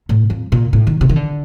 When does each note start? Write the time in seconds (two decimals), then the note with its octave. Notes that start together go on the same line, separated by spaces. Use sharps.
0.09 A2
0.30 F2
0.52 A#2
0.73 A2
0.87 D#3
1.01 C3
1.09 D#3
1.16 D3